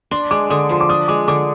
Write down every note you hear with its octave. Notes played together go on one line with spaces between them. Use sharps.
D4 C6
G#3 D6
D3 D#6
F3 C6
D6
D4 D#6
G#3 D6
D3 D6